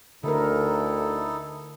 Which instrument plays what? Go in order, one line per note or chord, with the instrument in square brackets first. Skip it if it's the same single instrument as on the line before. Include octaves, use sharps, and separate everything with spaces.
[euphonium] D2 [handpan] D3 A#4 [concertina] D#4 E4 A4